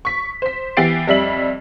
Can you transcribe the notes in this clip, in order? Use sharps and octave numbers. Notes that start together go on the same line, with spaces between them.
C#6 B6
C5 B6
E3 B3 G4 A6 C7 D7
F2 G3 E5 F#7